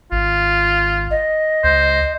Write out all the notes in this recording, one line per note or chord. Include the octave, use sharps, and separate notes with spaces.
G#1 F4
D#5
C#2 C5